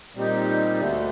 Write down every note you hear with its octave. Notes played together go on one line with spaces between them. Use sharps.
A#2 G3 C4 D#4 G4
D2 D3 A3